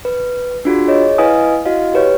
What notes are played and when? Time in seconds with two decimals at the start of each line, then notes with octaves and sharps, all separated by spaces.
0.05 B4
0.65 D4 F4 F#4 G#4
0.88 G#4 C#5 D#5
1.18 E4 B4 D#5 F5 G#5 D#6
1.66 E4 F#4 D#5 F5
1.94 G4 B4 C#5